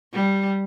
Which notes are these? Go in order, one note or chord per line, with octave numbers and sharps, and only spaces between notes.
G3